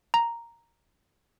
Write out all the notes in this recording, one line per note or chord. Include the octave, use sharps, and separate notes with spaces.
A#5